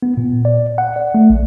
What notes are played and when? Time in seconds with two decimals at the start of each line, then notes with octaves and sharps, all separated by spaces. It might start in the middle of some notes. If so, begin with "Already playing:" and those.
0.03 B3
0.17 A#2
0.45 D5
0.78 F#5
0.96 D5
1.15 A3
1.30 A#1